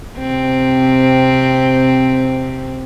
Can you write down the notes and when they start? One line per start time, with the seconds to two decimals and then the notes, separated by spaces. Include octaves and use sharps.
0.18 C3 C4